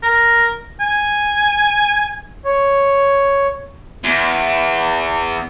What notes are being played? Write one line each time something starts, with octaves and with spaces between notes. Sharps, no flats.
A#4
G#5
C#5
E2